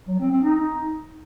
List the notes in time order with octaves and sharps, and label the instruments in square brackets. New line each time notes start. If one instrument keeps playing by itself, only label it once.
[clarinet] F#3
C4
C4
D#4